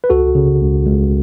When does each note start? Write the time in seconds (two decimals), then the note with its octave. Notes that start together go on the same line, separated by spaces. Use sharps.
0.04 B4
0.10 C#2 F#4 A4
0.35 C#3
0.61 C#2
0.86 C#2